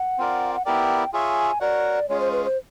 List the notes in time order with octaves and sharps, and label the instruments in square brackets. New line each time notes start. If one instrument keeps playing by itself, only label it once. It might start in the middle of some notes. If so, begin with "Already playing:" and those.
Already playing: [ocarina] F#5
[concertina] C4 F4 A#4 D5
[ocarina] F#5
[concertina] B3 E4 G4 A#4 D5 [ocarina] G5
[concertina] F4 G#4 C#5 E5 [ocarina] G#5
[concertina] F#4 A#4 C#5 F#5 [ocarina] D5
[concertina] G#3 C#4 F4 G#4 [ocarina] C#5
[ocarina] C5
B4
C5